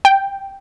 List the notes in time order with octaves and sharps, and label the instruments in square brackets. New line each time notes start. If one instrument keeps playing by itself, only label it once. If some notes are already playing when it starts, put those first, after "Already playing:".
[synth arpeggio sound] G5